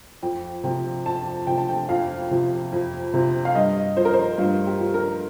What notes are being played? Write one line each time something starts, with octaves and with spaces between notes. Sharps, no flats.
F2 G5
C3 F3 G5
F2 A5
C3 F3 G5
A5
G5
F2 F5
C3 F3
F2
C3 F3
F5
G2 D#5
F3 C5
A#4
C5
G2 F4
G4
F3
A#4